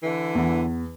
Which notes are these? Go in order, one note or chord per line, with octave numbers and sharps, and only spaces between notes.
D3 E3
E2